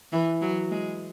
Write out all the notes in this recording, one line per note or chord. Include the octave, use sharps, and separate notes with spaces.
E3
F#3
G#3